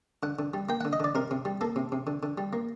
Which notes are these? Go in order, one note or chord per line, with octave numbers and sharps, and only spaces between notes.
D3 F#5
D3
G3
A#3 G5
D3 F#5
D#5
D3 D5
C3 A#4
C3
G3
A#3 A4
C3
C3
D3
D3
G3
A#3